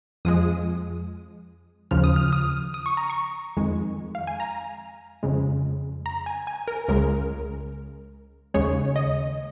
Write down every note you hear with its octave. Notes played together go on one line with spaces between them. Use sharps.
F2 F3 G#3 D#6
D#2 C#3 F3 F6
D#6
F6
D#6
D#6
C#6
A#5
C#6
F2 D#3 G#3
F5
G#5
A#5
F2 C#3 G#3
A#5
G#5
G#5
A#4
C#2 C#3 G#3 A#4
D#2 C#3 G#3 C#5
D#5